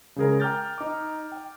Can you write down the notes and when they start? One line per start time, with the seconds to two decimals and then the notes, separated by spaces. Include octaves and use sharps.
0.16 C#3 G#3 G#4 A#4
0.40 G5 A#5 D6 F6 G6 A6
0.78 D#4 D6
1.32 G5